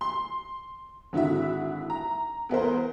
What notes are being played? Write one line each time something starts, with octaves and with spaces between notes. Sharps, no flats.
C6
G#1 D3 E4 F#4 E5
A#5
E2 B3 A#4 C5